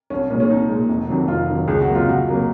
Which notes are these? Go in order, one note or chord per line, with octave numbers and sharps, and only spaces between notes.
C2 C#4
A#2 G#3 C#4
C#4
C2 D#4
A#2 G#3
F1
F2 D#3 F#3
F1 F4
F2 D#3 F#3
C#2 G#4
F#4
C3 F#3 A#3
F4
C#2 F#4
C3 F#3 A#3